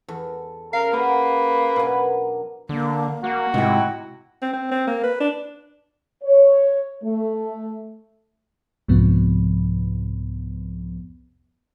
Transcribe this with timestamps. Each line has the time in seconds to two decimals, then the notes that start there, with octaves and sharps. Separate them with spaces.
0.08 E2 A4 A5
0.73 C#3 A#4 F5
0.93 A#3 G#4 B4 F#5
1.76 B2 F#3 D4 A#4 G#5
2.69 D3 A#3
3.24 A#3 F#4
3.54 G#2 C3 E4 G5
4.42 C4
4.53 C4
4.71 C4
4.87 A#3
5.03 B4
5.20 D4
6.24 C#5
7.03 A3
8.88 C2 F2 G#2 C3 F3 B3